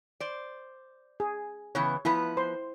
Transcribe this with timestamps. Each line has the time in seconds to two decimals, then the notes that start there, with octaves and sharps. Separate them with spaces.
0.20 C5 D5
1.20 G#4
1.75 C#3 E3 B3 C#5
2.05 F3 B3 E4 B4
2.37 C5 C6